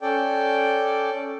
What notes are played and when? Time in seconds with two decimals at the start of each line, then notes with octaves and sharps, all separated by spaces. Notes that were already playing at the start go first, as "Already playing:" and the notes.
0.01 C#4 A4 D5 G5